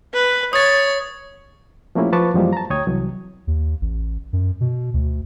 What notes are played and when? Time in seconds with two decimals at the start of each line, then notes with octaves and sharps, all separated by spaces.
0.14 B4
0.53 C#5 D#6 A6
1.95 F3 A3 A#3 C#4 E4 G4
2.12 F3 B4 A5 C#6 D6
2.34 F#2 E3 F3 G3 G#3 A#3
2.53 A5 A#5
2.70 D2 C#5 G5 D#6 G#6
2.87 C2 E3 F#3
3.47 D#2
3.81 A1
4.33 F#2
4.61 B2
4.94 D2